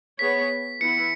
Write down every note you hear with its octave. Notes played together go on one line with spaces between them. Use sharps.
B3 G#4 C#5 B6
E3 B3 E4 C#7